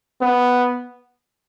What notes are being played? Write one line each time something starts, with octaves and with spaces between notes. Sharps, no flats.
B3